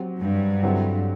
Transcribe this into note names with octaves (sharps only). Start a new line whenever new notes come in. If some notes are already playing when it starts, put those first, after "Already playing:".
Already playing: F#3 C4 G4
G2
D3 F#3 C4 E4 G4